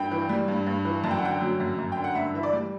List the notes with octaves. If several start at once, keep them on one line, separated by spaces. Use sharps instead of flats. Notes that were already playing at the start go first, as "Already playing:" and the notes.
Already playing: G2 G5
E3
G3
G2
G2
E3
F#2 A5
G5
F#5
D3 G5
F#3
F#2
F#2
D3 G5
F#5
G2 E5
E3 E5
D5
G3